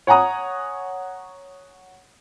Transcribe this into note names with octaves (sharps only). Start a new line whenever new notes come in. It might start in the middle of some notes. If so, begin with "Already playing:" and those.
C#5 F#5 G#5 A#5 D#6